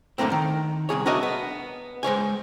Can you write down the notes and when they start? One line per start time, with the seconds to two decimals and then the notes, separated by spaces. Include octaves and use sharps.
0.18 F#2 A2 D3 A3 A#3 C4
0.32 D#3
0.89 C2 C#3 G#4 C#5
1.06 D4 F#4 A#4 C#5 D#5 E5
1.23 B3
2.03 G#3 C5 C#5 G#5